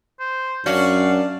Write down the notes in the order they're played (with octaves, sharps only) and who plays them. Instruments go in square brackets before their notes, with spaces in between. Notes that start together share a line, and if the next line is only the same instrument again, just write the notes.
[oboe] C5
[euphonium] F#2 [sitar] C#4 F#4 [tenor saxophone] D4 [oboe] F5